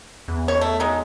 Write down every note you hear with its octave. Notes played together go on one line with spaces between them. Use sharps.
E2
B2 C#5 C#6
A3
F#3 G#3 D#4